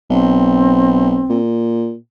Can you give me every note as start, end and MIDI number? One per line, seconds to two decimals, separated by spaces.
0.11 1.23 35
0.11 1.39 60
1.30 1.95 46